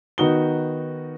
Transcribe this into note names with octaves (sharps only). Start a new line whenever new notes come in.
D#3 B3 D#4 F#4 D#6 G7